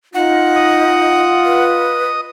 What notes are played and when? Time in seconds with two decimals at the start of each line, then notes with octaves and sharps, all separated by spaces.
0.14 D#4 F4 F#5
0.56 D#5 D#6
1.45 B4